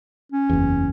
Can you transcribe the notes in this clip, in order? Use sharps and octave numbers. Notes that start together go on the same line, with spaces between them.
C#4
F#1 E2